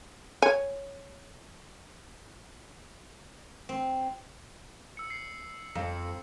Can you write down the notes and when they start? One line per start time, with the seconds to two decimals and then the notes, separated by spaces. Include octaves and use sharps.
0.42 C#5 G#5
3.69 C4
4.97 E6 C#7
5.10 C7
5.75 F2 C#7